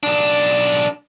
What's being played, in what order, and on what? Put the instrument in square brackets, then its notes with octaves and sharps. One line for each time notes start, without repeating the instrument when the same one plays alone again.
[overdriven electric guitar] B1 D4